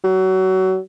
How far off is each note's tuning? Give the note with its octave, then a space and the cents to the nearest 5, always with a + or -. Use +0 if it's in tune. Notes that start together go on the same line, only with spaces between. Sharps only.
F#3 +25